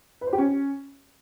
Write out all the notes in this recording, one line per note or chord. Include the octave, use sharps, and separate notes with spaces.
B4
C5
G4
C#4